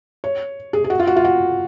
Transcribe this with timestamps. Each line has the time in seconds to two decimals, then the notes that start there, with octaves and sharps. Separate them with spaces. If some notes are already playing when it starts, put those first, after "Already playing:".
0.24 C#5
0.73 G#4
0.84 G#4
0.90 F#4
1.00 F4
1.07 F#4
1.16 F4
1.24 F#4